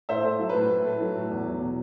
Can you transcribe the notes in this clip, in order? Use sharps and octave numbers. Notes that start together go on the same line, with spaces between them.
A2 C5 E5
A3
F#3
A2 B4
A2
A3
F#3
A2
E2
F#3
B2